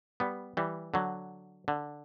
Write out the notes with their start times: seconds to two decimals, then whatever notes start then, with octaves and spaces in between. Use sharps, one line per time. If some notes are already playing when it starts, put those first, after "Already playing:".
0.20 G3 B3
0.57 E3 G3
0.94 D3 F#3
1.68 D3